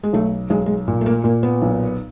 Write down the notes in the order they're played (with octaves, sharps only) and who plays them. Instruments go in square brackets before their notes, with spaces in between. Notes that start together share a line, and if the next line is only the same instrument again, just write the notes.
[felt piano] G#3
B1 A3
B1 G#3
G#3
A#2
A3
A#3
A#2 A#3
B3
B1